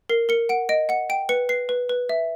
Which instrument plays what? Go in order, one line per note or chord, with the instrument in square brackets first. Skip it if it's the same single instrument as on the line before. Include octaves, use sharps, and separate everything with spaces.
[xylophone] A#4 C7
A#4 C#7
F#5 D7
D#5 D7
F#5 C#7
G5 D7
B4 C#7
B4 C7
B4
B4
E5